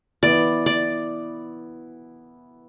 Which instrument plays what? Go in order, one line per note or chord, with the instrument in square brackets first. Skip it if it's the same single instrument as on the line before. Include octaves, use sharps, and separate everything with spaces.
[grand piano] E3 B3 E4 [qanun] D5
[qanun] D5